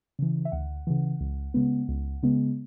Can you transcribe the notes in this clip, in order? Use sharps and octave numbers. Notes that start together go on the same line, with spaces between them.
C#3 E3
E5
D2 F#5
C#3 E3
C#2
C#3 G#3 B3
C#2
C#3 G#3 B3